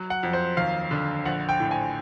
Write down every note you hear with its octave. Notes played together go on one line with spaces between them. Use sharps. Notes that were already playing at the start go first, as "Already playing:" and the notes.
Already playing: F#3
F#5
F2
C5
D#2 F5
D3
A#1 F#5
G5
A2
G#5